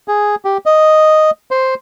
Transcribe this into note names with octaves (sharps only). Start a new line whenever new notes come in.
G#4
G4
D#5
C5